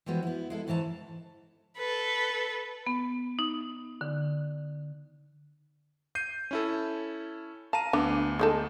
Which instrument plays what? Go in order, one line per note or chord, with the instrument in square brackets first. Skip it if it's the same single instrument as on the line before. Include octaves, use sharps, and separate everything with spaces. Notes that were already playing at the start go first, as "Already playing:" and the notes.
[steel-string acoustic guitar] E3 F3 G3 G#3 B3 F#4
B3 E4
G#3 E4 A4
D2 G#2 E3 C#5 G#5 A5
[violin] A4 B4
[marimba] B3
D#4
D3
[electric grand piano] G6 C7 D#7
C#4 E4 A4
[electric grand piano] F5 A#5 D#7 [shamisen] A5
[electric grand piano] D2 B3 [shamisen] D4
[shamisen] G#3 D#4 A4